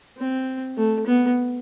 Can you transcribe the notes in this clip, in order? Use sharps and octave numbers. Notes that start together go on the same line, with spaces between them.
C4
A3
B3